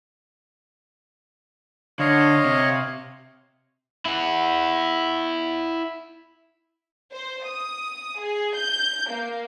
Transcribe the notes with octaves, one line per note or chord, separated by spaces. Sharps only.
D3 C#5 D#5 F5
C3
E4 F#5
C5
D#6
G#4
G6
A#3